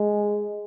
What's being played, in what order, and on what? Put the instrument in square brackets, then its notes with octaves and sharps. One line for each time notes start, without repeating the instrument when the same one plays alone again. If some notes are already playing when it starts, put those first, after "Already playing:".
Already playing: [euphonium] G#3